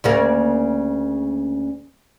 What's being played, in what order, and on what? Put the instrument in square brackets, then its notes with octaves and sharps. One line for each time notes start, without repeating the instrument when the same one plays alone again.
[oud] D2 C#3 A#3